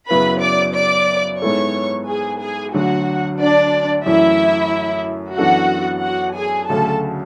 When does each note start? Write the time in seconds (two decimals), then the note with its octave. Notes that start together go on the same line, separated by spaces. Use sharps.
0.10 F#2 C#3 F#3 B3 E4 B4 B5
0.43 D5 D6
0.76 D5 D6
1.42 G#2 G#3 B3 E4 A4 C#5 C#6
2.08 G#4 G#5
2.41 G#4 G#5
2.74 D2 D3 F#3 F#4 F#5
3.40 D4 D5
4.06 F#2 E3 A3 E4 E5
5.38 F#2 E3 B3 D4 F#4 A4 F#5
6.03 F#4 F#5
6.37 G#4 G#5
6.70 D2 C#3 F#3 C#4 A4 A5